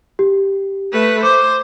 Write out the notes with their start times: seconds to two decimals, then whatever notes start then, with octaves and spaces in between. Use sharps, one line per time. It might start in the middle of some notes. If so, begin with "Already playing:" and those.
0.19 G4
0.92 A3 B4
1.23 C5 D6